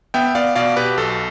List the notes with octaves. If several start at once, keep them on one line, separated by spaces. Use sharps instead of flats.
B3 E5 G5
B3 D5 F5
B2 D5 F5
B2 G4 B4
B1 A4